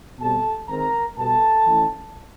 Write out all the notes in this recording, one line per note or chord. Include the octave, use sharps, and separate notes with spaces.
B2 G3 C4 A4 A5
D#3 G#3 C4 A#4 A#5
B2 G3 B3 A4 A5
E3 A3 C#4